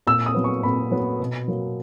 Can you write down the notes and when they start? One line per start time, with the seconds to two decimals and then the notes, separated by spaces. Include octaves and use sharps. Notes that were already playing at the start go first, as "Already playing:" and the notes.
0.07 A#2 E6
0.26 D#6
0.34 F#3 B3
0.44 C#6
0.63 A#2 B5
0.91 F#3 B3
1.20 B2
1.48 F#3 A#3